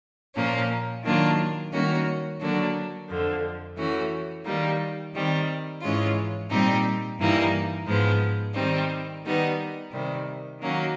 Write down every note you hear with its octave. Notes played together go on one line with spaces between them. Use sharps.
A#2 F3 A#3 C#4
D#3 F#3 A#3 D4 F4
D#3 G3 A#3 C#4 F#4
D3 F#3 A#3 D4 F#4
F2 D3 F3
E3 A3 C#4 F#4
D#3 G3 A#3 D#4
D#3 G3 C4
G#2 E3 G#3 C#4 F4
A#2 G3 C4 D#4 G4
G2 E3 G3 A#3 D#4
G#2 F3 G#3 B3
D#3 G3 C4 D#4
D#3 G3 B3 D#4
C3 D#3 G3
D#3 F#3 A#3 C#4